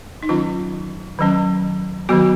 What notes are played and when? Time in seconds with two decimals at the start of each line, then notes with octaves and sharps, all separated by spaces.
0.23 D#4
0.29 D#3 F#3 C#4 F4
1.19 D#3 F#3 C#4
2.09 D#3 F#3 B3 F#4